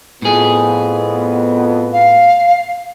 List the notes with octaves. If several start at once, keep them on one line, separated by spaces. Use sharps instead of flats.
F2 A2 B3 G#4
F5